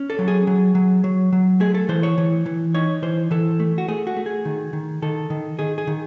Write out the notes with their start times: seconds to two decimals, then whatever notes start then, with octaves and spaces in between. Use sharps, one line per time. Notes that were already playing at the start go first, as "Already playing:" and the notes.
Already playing: C#4
0.10 A4
0.19 F#3
0.28 G#4
0.47 F#3
0.75 F#3
1.04 F#3
1.32 F#3
1.60 A3 G#4
1.74 A4
1.89 E3 C5
2.03 C#5
2.18 E3
2.46 E3
2.75 D#4 C#5
3.02 E3 C5
3.31 E3 A4
3.60 A3
3.78 F#4
3.88 A3 G#4
4.07 F#4
4.16 A3
4.26 G#4
4.45 D#3
4.73 D#3
5.02 D#3 A4
5.30 D#3
5.59 D#3 G#4
5.78 G#4
5.87 D#3